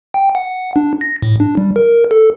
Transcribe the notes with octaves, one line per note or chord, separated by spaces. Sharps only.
G5
F#5
D4
A#6
A2
D4
G3
A#4
A4